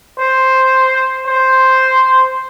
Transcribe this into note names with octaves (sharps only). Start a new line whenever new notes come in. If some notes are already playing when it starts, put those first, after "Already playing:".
C5
C5